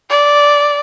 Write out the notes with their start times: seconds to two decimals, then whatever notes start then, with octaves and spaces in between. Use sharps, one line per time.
0.10 D5